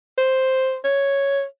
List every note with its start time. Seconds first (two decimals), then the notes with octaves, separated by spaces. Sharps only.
0.18 C5
0.85 C#5